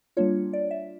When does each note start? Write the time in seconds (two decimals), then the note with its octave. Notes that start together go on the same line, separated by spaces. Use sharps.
0.17 G3 A#3 D4 F4 C#5
0.53 D5
0.71 E5